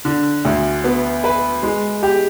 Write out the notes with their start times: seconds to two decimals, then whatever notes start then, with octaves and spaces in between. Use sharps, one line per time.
0.05 D3
0.45 D2
0.84 B3
1.24 B4
1.63 G#3
2.03 G4